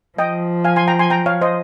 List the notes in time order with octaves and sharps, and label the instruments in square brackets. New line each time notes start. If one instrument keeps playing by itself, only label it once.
[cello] F3 [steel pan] D#5 G5
[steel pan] F5 G#5
G#5 C6
G5 A#5
G#5 C6
G5 A#5
C#5 F5
C5 D#5